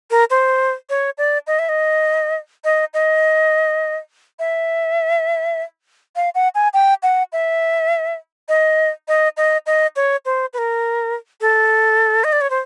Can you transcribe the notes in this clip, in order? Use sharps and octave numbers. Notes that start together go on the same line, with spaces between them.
A#4
C5
C#5
D5
D#5
E5
D#5
D#5
D#5
E5
F5
F#5
G#5
G5
F#5
E5
D#5
D#5
D#5
D#5
C#5
C5
B4
A#4
A4
D#5
D5
C#5
C5